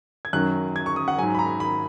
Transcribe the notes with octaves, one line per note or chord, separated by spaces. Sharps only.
G#6
F#2 D#3 F#3 F#6
G#6
C#6
D#6
F#5
G#2 F#3 G#5
B5
A#5
B5